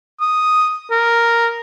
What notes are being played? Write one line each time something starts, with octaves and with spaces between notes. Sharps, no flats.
D#6
A#4